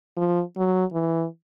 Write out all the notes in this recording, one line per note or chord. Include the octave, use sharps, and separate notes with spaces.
F3
F#3
E3